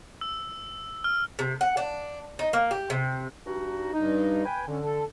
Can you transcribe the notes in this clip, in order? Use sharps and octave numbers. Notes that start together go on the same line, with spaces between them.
E6
F6
C3
F#5
D4
D#4
A#3
G4
C3
G2 D#4 F#4
G2 D#4
B4 G5 G#5
D3 C#4
A4